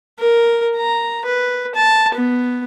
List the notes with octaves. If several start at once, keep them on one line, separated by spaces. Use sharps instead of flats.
A#4
A#5
B4
A5
B3